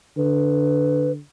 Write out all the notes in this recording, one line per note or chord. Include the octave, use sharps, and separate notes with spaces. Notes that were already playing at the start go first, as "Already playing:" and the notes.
D3 B4